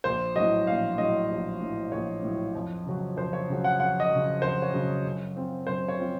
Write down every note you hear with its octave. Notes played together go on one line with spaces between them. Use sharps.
A#1 C5
A2 F#3 D#5
A#1 F5
A2 F#3 D#5
A#1
A2 F#3
A#1 C#5
A2 F#3
F2
C#3 F#3
F2 C5
C#5
C#3 F#3
F#5
F2 F#5
D#5
C#3 F#3
F2 C5
C#5
C#3 F#3
F#2
F3 C4 F4
F#2 C5
C#5
F3 C4 F4